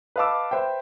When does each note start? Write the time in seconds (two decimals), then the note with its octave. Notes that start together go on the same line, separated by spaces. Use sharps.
0.16 B4 D#5 F5 A5 D6 E6
0.51 B4 C5 E5 G5